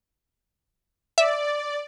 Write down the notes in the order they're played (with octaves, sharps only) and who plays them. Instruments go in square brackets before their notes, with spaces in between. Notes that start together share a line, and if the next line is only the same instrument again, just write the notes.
[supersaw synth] D5 [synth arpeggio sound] E5